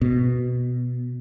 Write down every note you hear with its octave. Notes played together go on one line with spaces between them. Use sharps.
B2